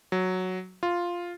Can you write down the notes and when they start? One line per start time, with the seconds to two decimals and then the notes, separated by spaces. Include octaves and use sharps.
0.12 F#3
0.83 F4